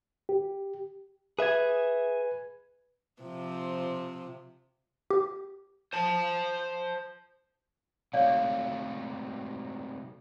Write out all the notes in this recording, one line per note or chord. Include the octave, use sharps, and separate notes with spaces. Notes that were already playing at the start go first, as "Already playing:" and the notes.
G4
G#4 B4 E5 G#6
C3 F3
G4
C5 A5
C3 F#3 A3 C#5 D5 F5